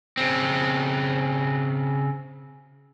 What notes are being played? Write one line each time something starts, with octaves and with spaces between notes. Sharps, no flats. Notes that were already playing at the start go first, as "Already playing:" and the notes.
C#3 C4